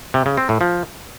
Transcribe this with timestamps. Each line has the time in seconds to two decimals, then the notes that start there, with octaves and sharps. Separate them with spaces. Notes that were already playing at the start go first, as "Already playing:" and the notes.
0.14 C3
0.26 C#3
0.37 C4
0.49 A2
0.61 F3